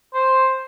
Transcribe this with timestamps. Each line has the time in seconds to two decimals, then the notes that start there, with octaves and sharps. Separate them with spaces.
0.14 C5